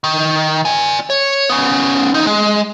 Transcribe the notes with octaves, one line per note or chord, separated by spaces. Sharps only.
D#3
D5 G#5
C#5
B3 C#4
E2 D#4
G#3